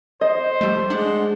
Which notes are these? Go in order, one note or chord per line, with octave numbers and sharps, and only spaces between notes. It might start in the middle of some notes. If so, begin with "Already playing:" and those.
C5 D#5
F3 G3 A3
G#3 D4 F#5